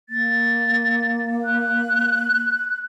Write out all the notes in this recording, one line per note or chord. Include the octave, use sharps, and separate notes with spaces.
A#3 A6
F#6